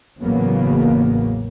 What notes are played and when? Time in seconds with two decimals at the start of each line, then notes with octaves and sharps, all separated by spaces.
0.21 A1 E2 C#3 F#3 A#3 B3